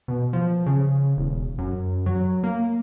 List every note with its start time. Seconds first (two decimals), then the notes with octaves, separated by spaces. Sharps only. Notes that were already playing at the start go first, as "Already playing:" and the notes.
0.08 B2
0.33 F3
0.66 C#3
1.17 E1
1.58 F#2
2.06 F#3
2.43 A#3